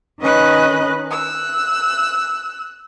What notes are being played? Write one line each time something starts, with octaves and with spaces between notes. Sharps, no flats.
D#3 C#4 B4 D#5 F#6
E6 F#6